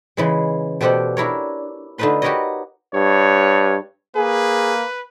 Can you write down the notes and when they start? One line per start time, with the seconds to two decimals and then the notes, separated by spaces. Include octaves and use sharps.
0.17 C#3 E3 G#3
0.81 B2 A3 G4 C5 D5 F#5
1.17 D4 E4 A#4 C#5
1.98 D3 A3 D#4 F4 B4 C6
2.22 F#4 G4 A#4 B4 C#5 D#5
2.94 G2 C#5
4.16 A#3 G#4 B4